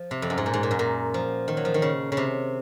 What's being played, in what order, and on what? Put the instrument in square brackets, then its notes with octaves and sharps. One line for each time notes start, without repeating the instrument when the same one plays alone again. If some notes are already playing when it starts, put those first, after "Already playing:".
Already playing: [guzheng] F3
C3
F2
F#2
G#2
A#2
G#2
A#2
F#2
A#2
F3
D#3
F#3
F3
D#3
C#3
C#3
C3